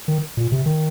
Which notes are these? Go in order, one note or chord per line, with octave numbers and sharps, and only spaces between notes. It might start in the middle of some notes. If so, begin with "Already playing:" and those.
D#3
A#2
C3
D#3